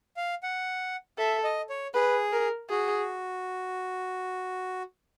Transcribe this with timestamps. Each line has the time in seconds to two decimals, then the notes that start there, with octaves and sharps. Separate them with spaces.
0.17 F5
0.43 F#5
1.18 A4 E5
1.44 D#5
1.70 C#5
1.95 G#4 B4
2.32 A#4
2.70 F#4 G#4